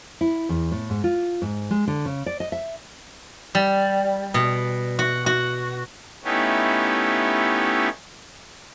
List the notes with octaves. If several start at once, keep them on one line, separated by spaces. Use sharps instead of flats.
E4
E2
A2
G#2
F4
G#2
G#3
D3
C#3
D5
D#5
E5
G3
B2
F#4
F#4
A3 B3 C#4 D#4 E4 G4